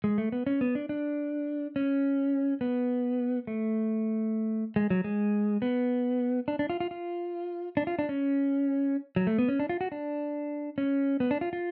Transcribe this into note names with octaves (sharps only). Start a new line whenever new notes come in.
G#3
A3
B3
C#4
B3
D4
D4
C#4
B3
A3
G#3
F#3
G#3
B3
D4
D4
F4
F4
F4
D4
F4
D4
C#4
F#3
A3
B3
C#4
D4
F4
F#4
D4
C#4
B3
D4
F4
F4